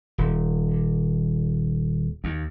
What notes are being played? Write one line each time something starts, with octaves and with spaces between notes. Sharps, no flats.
D#1
D#2